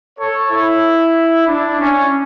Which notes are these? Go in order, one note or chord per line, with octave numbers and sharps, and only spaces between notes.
A4 C#5
E4
D4
C#4